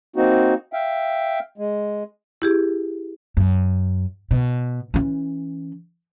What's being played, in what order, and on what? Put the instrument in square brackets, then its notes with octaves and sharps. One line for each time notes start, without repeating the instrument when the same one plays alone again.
[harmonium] A#3 C4 D#4 F#4
E5 F5 G5
G#3
[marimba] E4 G4 G#4
[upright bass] F#2
B2
E3 C#4